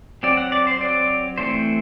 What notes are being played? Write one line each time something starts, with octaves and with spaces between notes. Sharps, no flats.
F#3 C4 D5
F#5
D5
C5
F#3 C4 D5
E3 A3 C4 C5